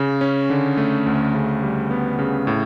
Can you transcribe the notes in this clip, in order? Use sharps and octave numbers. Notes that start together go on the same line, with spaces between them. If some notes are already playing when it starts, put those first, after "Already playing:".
Already playing: C#3
C#4
D3
A3
D2
C#3
G3
B3
C#3
A2